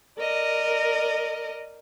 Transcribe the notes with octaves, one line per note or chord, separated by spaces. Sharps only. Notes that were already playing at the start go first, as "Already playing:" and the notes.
A#4 D5 D#5